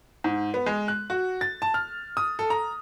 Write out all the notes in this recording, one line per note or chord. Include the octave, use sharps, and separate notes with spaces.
G#2
B3
G#3
F#6
F#4
A6
A5
F6
D#6
A4
A#5